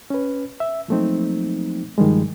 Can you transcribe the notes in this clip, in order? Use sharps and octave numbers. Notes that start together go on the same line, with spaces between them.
C#4 B4
E5
F3 F#3 A3 A#3 C4 D#4
G2 D#3 F3 G3 G#3